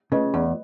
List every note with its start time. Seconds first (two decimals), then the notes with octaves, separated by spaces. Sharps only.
0.12 C#3 B4 D#5
0.34 E2